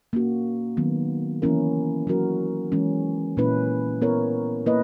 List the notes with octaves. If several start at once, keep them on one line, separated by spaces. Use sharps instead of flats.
A#3 C#4 F#4
D#3 F#3 B3
E3 A#3 C#4 E4 A#4
F#3 C#4 F#4 A#4
E3 G#3 C#4
A#2 A#3 C#4 E4 B4
B3 E4 A#4 C#5
A#3 E4 B4 D#5